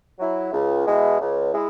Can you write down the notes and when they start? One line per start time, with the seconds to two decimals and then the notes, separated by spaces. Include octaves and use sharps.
0.19 F#3 E4
0.53 C#2
0.86 B2 G#3 E4
1.20 C#2
1.53 G#3 E4